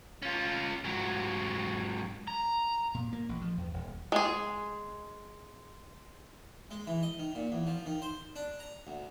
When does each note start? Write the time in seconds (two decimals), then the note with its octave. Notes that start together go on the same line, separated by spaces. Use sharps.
0.22 C#4 F4
0.84 G#2 F#3
2.27 A#5
2.94 A#2
3.13 A#3
3.29 A1
3.42 F3
3.58 E2
3.73 D#1
4.12 G#3 G#4
6.71 G#3
6.87 E3
7.03 D#5
7.19 D#3
7.35 A#2
7.52 E2
7.67 F3
7.86 D#3
8.02 C5
8.36 D4
8.59 A#5
8.87 D2